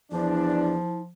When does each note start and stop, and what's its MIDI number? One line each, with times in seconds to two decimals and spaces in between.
0.12 0.79 40
0.12 1.13 53
0.12 0.74 62
0.12 1.01 64